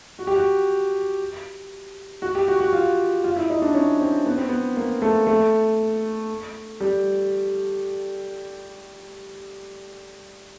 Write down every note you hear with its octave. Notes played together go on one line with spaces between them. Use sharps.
F#4
G4
F#4
F#4
G4
F#4
F#4
F4
F4
E4
D#4
D4
C#4
C4
B3
C4
B3
A#3
A3
A3
G3